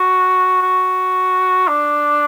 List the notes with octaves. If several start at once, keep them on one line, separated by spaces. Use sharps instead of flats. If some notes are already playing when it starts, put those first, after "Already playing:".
Already playing: F#4
F#4
D4